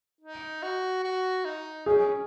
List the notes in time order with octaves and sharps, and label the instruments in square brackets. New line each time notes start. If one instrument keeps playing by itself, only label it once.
[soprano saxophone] D#4
F#4
F#4
D#4
[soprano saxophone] C#4 [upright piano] G#4
[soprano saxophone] C#4